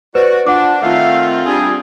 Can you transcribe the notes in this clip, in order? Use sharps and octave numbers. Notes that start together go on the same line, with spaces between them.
F#4 B4 C5 D5
D4 F4 F#5 D6
D#3 A3 C4 F4 F5
G3 D4 G#4